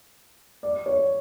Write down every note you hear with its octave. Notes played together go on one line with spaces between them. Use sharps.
D5
C#5